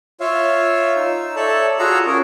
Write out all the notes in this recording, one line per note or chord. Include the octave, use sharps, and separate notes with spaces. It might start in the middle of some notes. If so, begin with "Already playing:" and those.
F4 C#5 E5 F5
D#4 E6
A4 C#5 D5 E5 A5
F4 F#4 G#4 F5 A#5 E6
C#4 G#4 A#4